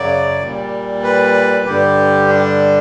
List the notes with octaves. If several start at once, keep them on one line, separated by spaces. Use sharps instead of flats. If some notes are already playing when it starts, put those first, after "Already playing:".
Already playing: F#2 C#3 F#3 D5
A#2 G3
B4
G2 D3 G3 G4
D4